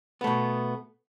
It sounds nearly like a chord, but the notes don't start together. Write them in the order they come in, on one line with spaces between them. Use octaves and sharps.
B3 A3 B2